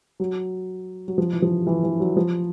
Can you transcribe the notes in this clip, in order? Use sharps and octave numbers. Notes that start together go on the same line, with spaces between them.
F#3
F#3
F3
E3
F3
E3
E3
F#3
F3